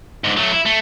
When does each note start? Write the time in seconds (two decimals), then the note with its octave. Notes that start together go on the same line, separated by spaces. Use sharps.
0.24 G#2 D3
0.37 F#3 A3
0.52 E4
0.66 A3